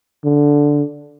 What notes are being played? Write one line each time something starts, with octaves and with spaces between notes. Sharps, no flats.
D3